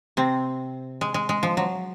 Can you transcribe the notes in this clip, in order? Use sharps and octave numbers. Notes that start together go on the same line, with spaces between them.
C3 C4
G#3
G#3
G#3
F3
F#3